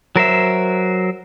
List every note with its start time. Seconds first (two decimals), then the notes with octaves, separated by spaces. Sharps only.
0.16 F#3 A#4 C5 E5